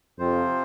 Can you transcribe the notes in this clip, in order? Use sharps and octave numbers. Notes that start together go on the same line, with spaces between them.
F2 C3 F3 C4 F4 C5